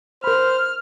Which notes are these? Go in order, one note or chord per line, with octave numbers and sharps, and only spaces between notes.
A#4 C5 B5 F6